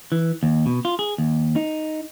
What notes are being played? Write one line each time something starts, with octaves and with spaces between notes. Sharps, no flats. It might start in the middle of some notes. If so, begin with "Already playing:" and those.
E3
D#2
B2
F4
G#4
D#2
D#4